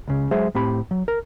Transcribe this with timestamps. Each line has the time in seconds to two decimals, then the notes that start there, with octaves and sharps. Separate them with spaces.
0.08 C#2 C#3
0.31 F#3 G#3 G#4 C5 E5
0.55 A2 C4 G4 B5
0.91 F#3
1.08 A#4